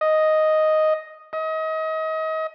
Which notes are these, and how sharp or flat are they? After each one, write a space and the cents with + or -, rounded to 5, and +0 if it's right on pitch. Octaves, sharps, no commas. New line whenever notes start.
D#5 +0
D#5 +30